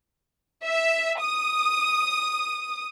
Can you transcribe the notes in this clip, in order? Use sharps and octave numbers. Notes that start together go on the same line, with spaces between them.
E5
D#6